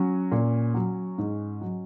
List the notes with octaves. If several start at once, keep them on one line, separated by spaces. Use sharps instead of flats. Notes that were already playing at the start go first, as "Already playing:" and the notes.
Already playing: F#3 C#4
A#2
F#3
G#2
F#3